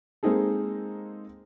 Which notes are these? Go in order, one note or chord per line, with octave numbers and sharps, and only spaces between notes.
G#3 A#3 C4 D#4 G#4 A4